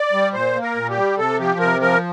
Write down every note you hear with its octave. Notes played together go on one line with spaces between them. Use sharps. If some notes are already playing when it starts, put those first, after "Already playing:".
Already playing: D5
G3
A#2 C5
A#3
A#4
A#2
G4
G3
C3 A4
F3 G4
C3 A#4
F3 A#4